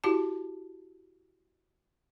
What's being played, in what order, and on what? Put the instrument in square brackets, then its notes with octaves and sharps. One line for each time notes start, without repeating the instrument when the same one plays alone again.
[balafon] E4 F#4 G4 A5